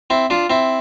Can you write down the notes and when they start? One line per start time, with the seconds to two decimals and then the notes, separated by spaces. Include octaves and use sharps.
0.10 C4 E4
0.30 D4 F4
0.50 C4 E4